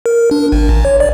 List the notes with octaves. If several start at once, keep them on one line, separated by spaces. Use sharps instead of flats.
A#4
D4
G#1
A1
C#5
D5